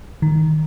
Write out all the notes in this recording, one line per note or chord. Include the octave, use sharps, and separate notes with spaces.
D#3